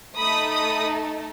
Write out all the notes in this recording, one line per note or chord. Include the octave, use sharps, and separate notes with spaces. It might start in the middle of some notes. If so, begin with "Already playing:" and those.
A3 D#4 A4 B5 D#6
B5 D#6